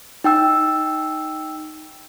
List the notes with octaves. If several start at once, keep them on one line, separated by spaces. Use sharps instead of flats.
D#4 G5 E6